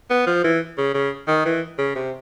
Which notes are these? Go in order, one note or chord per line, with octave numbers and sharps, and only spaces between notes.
B3
F3
E3
C#3
C#3
D#3
E3
C#3
C3